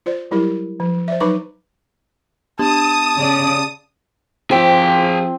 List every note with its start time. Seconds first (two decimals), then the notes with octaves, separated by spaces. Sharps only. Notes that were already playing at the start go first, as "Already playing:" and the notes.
0.06 F4 C5 D5
0.31 F#3 G3 E4 G4 A#4
0.80 F3
1.08 C5 D5 E5
1.20 F#3 D#4 B4 B5 C#6 D6
2.59 B3 D4 G4 A5 D#6
3.16 C#3 D5
4.51 F3 C4 G#4 G5